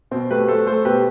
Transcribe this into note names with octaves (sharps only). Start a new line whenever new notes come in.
B2 C4
A3 G4 B4
A3 A4 C5
A3 A4 C5
B2 G4 B4